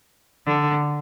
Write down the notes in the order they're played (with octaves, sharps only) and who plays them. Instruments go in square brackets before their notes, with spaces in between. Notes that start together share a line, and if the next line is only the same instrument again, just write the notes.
[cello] D3